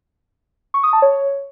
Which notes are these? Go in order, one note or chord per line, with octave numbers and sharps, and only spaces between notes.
C#6
D#6
A5
C#5